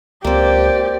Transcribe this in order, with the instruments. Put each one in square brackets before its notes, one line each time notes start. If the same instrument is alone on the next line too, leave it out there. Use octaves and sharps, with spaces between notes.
[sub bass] C#2 [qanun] A#3 C4 [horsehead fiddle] G4 [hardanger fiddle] D5